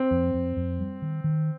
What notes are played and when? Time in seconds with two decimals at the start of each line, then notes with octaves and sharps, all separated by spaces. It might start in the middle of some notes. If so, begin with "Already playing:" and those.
Already playing: C4
0.11 F2
0.34 F2
0.57 F2
0.79 G3
1.02 D#3
1.24 D#3